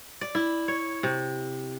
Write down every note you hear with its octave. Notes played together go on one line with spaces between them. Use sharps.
D5
E4
C#5
C3